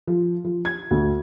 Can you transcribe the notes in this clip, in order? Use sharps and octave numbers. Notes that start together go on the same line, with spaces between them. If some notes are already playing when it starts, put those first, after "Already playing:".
F3
F3
G#6
D2